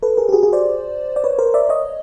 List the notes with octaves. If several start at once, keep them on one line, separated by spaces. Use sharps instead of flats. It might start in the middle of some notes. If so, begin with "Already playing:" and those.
A4 B4
G#4 A#4
G4
F#4 G#4
F#4 G#4
C5 D5
D5
B4 C#5
A#4 C5
D5 E5
C#5 D#5